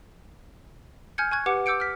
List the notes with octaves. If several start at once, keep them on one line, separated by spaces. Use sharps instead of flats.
G#5 F6 G6 G#6 C#7
G#5 C#6 F#6 G#6
G4 B4 F#5 D6 C#7
D6 E6 G6 C#7 D7
F6 B6